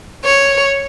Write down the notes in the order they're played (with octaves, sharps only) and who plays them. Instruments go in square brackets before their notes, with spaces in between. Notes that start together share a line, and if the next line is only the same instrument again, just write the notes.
[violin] C#5